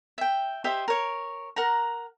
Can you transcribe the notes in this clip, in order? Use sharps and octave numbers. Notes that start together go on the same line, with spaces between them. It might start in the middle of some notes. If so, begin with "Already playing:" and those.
E5 G5
G4 C5 D#5 E5
A#4 C#5
A#4 F#5 A#5